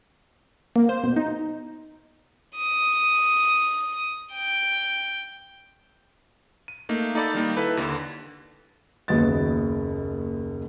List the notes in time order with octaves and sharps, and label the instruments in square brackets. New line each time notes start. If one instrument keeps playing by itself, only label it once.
[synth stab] A#3
C5
B2
D#4
[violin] D#6
G5
[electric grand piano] D#7
A3 A#3 D#4
D#4 A4 D5 B5 A6
D#3 G3 A#3 D#4
E4 A4 B4
D#2 D3
[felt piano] F#1 D#2 F#3 B3 D#5 A6